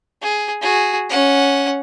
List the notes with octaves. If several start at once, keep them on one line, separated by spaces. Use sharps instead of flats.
G#4
F#4 G#4
C#4 F#5